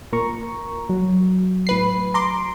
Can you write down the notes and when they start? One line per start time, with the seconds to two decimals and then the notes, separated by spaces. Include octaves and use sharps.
0.13 A#2 A#4 A#5 C#6
0.89 F#3
1.67 A2 B4 C7
2.14 A#5 C6 D6